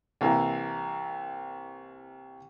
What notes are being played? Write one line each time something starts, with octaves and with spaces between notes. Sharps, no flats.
C2 E3 A#3